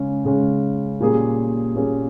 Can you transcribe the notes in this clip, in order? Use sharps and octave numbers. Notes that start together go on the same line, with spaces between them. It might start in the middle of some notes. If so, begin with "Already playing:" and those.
Already playing: C#3 G#3 C#4
C#3 G#3 C#4
A#2 G3 A#3 C#4 G#4
A#2 G3 A#3 C#4 G#4